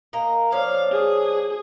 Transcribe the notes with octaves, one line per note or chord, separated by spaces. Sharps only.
A#3 A#4 D#5
F3 C#4 D4 F5
G#4